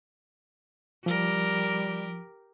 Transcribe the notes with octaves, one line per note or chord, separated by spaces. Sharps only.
F3 G3 G4 A#4